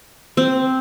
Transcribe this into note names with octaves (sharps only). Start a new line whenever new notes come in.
C4